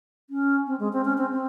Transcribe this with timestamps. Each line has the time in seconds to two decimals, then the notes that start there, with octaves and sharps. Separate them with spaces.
0.30 C#4
0.67 C4
0.80 G#3
0.93 C4
1.05 C#4
1.18 C4
1.30 C4